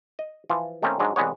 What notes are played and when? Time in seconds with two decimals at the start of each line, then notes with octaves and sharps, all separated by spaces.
0.19 D#5
0.50 E3 F3 F4
0.83 D#3 A3 A#3 C4 C#4
0.99 G#2 F#3 G#3 D4
1.16 C2 E3 G#3 B3 C#5